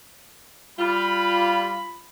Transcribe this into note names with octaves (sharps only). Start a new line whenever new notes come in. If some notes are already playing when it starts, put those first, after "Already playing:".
G3 F4 B5